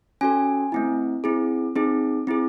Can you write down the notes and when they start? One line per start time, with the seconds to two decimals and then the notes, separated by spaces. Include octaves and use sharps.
0.21 C#4 F#4 A4 G#5
0.72 A3 C4 E4
1.24 C4 E4 G#4
1.76 C4 D#4 G#4
2.27 C4 E4 G#4